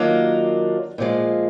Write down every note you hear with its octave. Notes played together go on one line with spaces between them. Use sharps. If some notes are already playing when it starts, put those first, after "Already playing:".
Already playing: D#3 F#3 A#3 D4 F4
A#2 F3 G#3